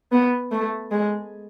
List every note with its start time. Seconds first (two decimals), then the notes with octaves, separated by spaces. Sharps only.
0.12 B3
0.52 A3
0.91 G#3